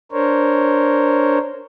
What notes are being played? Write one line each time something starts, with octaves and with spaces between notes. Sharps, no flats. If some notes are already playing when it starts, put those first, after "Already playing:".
D4 A#4 C5 C#5